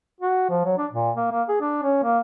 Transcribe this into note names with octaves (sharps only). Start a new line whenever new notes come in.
F#4
F3
F#3
D4
A#2
A#3
A#3
G#4
D4
C#4
A#3